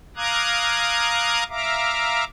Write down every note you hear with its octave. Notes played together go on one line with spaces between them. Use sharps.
F5 A#5 D6 D#6 F#6 G#6
E5 F5 A#5 D6